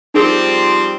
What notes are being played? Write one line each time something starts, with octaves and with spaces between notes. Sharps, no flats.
F3 G3 C4 D#4 G#4 A#4